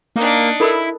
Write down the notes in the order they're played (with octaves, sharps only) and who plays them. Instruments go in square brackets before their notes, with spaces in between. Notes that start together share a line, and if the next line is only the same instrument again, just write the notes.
[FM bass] A#3 [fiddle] D4 D#4
[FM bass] E4 [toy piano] A4 A#4 B5